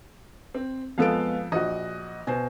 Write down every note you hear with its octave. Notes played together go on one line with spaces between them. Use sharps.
C4
F2 G#3 B3 A4 F5 D7
A#1 F#4 D#5
B2 C5 G#5